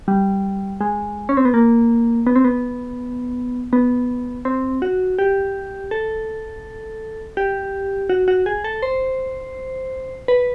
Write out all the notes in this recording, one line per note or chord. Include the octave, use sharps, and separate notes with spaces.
G3
G#3
C#4
C4
B3
A#3
B3
C4
B3
B3
C4
F#4
G4
A4
G4
F#4
F#4
G#4
A4
C5
B4